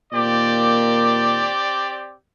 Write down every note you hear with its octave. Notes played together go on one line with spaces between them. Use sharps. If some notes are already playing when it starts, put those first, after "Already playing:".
A#2 D#3 A#3 C4 G4 D5